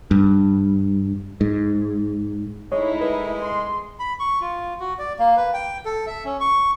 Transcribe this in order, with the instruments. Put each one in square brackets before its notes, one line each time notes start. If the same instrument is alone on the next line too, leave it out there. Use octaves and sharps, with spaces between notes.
[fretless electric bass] G2
G#2
[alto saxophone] G#3 [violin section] A3 D#4 E4 [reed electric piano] C#5
[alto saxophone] G#3 [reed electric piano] A#4 B4
[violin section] C6
[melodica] B5
C#6
F4
F#4
D5
A#3
B4
G5
A4
E5
C#4
C#6